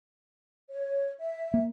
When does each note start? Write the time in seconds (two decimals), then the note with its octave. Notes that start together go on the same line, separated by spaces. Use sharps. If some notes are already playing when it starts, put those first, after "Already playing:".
0.71 C#5
1.20 E5
1.54 A#3